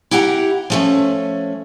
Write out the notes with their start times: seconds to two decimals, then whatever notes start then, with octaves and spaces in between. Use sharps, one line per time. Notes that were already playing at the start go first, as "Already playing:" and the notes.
0.11 E4 G4 F#5 G5 A#5
0.70 F3 A3 C#4